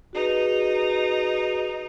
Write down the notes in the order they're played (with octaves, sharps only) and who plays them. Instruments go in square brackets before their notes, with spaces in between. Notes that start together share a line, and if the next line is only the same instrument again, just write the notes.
[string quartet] D#4 [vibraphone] F#4 G#4 B4